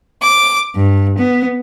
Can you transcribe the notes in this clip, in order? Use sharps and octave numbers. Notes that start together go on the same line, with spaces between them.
D6
G2
B3